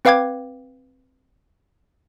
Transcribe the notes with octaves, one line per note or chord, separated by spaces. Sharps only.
C4 B4 F5 G5 D6 G#6